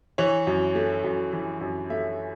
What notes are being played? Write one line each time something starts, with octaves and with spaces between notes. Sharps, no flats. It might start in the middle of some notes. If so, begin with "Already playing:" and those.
E3 C#5
F#2
A3
F#2
E3
F#2
A3 E5